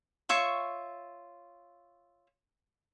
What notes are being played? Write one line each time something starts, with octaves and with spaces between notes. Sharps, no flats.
F4 C#5 E5 C#6